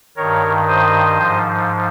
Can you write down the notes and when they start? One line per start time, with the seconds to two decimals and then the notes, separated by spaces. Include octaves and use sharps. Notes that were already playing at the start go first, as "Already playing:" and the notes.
0.16 G2 D#3 A#4 C#5
0.68 C5 D#5
1.18 G#2 F3